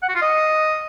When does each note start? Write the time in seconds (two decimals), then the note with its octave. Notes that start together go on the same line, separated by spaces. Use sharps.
0.02 F#5
0.09 F#4
0.15 F4
0.22 D#5